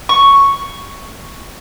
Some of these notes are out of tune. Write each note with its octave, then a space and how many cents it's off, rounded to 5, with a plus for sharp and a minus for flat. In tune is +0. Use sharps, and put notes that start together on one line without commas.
C#6 +0